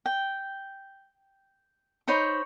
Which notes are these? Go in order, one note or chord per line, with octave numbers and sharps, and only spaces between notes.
G5
D#4 C5 C#5 B5